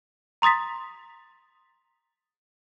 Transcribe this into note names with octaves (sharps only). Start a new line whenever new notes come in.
A#5 C6 D#6 A6 B6